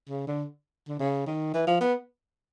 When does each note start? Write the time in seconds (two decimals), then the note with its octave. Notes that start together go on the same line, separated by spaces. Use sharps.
0.09 C#3
0.27 D3
0.89 D3
1.00 C#3
1.27 D#3
1.54 E3
1.67 F3
1.81 B3